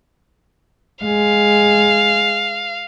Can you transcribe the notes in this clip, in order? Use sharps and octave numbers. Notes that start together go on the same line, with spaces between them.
G#3 F5